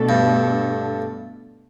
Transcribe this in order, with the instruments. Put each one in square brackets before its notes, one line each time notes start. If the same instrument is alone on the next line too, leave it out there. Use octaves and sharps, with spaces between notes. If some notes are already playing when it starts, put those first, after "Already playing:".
Already playing: [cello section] B2 A3 D4 A4
[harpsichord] G2